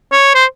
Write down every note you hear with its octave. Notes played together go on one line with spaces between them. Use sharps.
C#5
C5